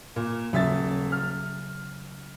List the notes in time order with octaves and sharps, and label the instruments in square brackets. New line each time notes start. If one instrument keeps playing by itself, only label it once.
[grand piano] A#2
[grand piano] D#1 E5 A6 [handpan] C#3 F#3
[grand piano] F6